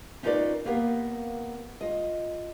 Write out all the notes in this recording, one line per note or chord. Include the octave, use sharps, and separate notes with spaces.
C#4 D#4 F4 A#4 B4 D5
A#3 B3 G4 A#4 F5
F4 D#5